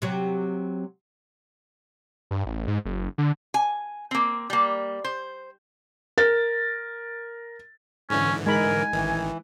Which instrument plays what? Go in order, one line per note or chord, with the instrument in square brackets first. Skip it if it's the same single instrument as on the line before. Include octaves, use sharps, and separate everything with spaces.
[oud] C3 F#3
[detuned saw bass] G2
A1
G#2
F#1
D3
[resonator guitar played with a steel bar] G#5
A#3 C4
G3 A#3
C5
[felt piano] A#4 A6
[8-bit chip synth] G#2 D3 E3 [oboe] C#4
[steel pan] G#3 D#4 B5 [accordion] A#4 [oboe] G#5
[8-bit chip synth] A1 D#3 [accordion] E3